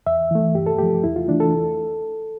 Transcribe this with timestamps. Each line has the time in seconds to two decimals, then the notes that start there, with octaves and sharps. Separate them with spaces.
0.07 E2 E5
0.31 E3 A3
0.55 G2 G4
0.66 A4
0.78 F3 A3 G4
1.04 E2 E4
1.16 F4
1.28 E3 A3 D4
1.40 A4